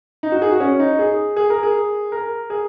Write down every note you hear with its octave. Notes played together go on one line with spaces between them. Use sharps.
D#4
F#4
G#4
F#4
C#4
D#4
G#4
G#4
A#4
G#4
A#4
G#4